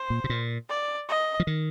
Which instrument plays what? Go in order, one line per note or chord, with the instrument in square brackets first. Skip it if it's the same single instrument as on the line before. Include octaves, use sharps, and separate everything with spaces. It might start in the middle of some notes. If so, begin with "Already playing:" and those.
Already playing: [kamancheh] C5
[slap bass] A#2
C3
A#2
[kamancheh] D5
D#5
[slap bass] F3
D#3